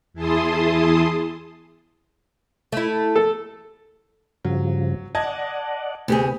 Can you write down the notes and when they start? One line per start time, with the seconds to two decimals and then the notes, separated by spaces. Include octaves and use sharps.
0.13 E2 E4 G#4 A5 C6 D#6
2.72 A3 E4
3.16 A4
4.45 G2 C#3 F3 F#3
5.15 D5 D#5 F#5 A5 G#6
6.08 D2 C3 B3 G4 G#4